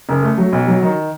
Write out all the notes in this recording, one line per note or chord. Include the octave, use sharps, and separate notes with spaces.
F#1
A3
F#3
B1
F#3
D#3